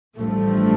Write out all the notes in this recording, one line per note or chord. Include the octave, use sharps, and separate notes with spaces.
A1 G2 F3 A3